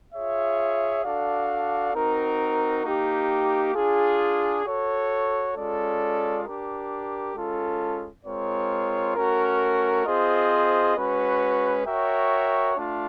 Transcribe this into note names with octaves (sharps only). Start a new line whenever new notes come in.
F4 G#4 C#5 E5
D4 F#4 A4 D5 F5
C4 D#4 F#4 A#4
A#3 D#4 G4
D4 F4 G#4
F#4 A4 C#5
G#3 C#4 F4 A4 D5
D4 G4 A#4
G#3 C#4 F4 A4
G#3 C4 F4 A#4 C#5
A3 C#4 F#4 A#4
C4 F4 G#4 C5 D#5
G#3 C#4 F#4 B4
F#4 A#4 C#5 E5 G5
A3 D4 F4